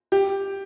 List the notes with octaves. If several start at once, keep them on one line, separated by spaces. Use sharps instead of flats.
G4